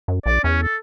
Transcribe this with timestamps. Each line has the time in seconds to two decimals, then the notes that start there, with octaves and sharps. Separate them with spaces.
0.08 F#2
0.26 A#1 D5
0.44 E2 C#4
0.63 A4